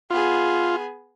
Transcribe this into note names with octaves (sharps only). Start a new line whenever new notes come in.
B3 F4 G#4